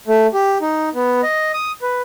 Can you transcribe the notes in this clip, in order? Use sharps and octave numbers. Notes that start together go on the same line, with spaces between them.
A3
G4
D#4
B3
D#5
D#6
B4